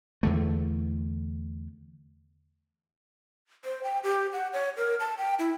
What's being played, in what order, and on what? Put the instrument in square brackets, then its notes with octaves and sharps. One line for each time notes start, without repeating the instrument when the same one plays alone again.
[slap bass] E2 D3 A3
[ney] C5
G5
G4
F#5
C#5
A#4
A5
G5
E4